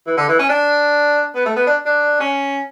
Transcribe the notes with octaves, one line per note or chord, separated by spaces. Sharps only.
E3
D3
E3
C#4
D4
B3
A3
B3
D4
D4
C#4